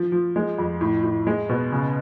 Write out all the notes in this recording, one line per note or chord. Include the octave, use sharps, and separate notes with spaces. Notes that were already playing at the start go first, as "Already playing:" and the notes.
Already playing: F3
F3
G#3
F2
A2
A2
G#3
B2
C#3